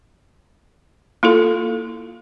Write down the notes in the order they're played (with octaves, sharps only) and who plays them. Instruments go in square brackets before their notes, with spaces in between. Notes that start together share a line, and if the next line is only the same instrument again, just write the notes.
[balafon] A#3 E4 F4 A4